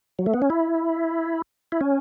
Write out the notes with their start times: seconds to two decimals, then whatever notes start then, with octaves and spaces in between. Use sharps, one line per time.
0.19 F#3
0.26 A3
0.34 B3
0.42 C#4
0.50 E4
1.72 E4
1.81 C#4